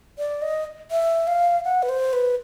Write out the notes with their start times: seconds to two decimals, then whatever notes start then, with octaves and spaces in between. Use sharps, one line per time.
0.18 D5
0.42 D#5
0.91 E5
1.27 F5
1.65 F#5
1.83 B4
1.89 C5
2.13 B4